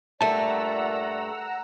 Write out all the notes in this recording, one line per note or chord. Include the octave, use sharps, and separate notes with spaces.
G2 A#2 A3 D5 F#5 A5 A#5 E6